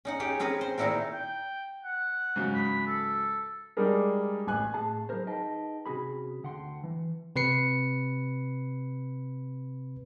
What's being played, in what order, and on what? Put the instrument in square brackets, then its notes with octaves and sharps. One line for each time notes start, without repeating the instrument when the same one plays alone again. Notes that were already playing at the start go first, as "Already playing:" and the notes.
[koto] C#4 D#4 F#5
C#4 G4 G#4
C4 C#4 G#4 A#4 B4
C5
A#2 D#3 D#4 E4 F#4 A#4
[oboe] G5
F#5
[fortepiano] G#2 C#3 F#3
[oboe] B5
A4
[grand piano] G3 G#3 D4 G#4 A#4
A1 G#5 F#6
[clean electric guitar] A2 G#4 A5
F#3 G#3 E4 G#4 A#4 C5
D#4 G#4 B4 D#5 G5 A5
C3 C#4 F#4 G#4 B5
D2 D3 F#5 G5 C6
E3
[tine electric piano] C3 B4 C7 C#7